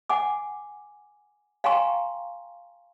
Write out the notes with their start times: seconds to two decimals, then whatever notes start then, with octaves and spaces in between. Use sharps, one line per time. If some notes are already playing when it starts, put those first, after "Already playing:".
0.09 F#5 G#5 D6
1.64 F5 G5 G#5 A#5 C6 C#6